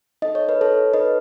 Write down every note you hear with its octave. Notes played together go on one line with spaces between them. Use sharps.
D#4 A4 D#5
C#5
B4
A4 C#5
D#4 A4 B4 D#5